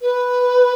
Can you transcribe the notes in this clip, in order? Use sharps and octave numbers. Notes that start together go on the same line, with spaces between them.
B4